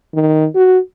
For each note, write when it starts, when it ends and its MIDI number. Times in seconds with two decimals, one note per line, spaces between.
0.15 0.46 51
0.55 0.78 66